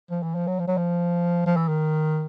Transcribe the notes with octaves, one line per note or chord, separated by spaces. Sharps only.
F3
E3
F3
F#3
F3
F#3
F3
F3
E3
D#3